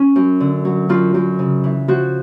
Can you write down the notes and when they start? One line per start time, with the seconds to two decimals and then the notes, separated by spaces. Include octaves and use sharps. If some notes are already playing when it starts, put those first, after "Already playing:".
Already playing: C#4
0.16 F#2
0.40 D3
0.65 F#3
0.89 F#2 F4
1.14 F#2
1.39 C#3
1.64 E3
1.88 F3 F#4